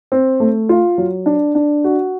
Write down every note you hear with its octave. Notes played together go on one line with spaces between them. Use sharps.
C4
A3
F4
F#3
D4
D4
F#4